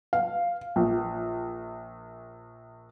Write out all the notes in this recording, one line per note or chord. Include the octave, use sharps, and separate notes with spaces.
F5
A#1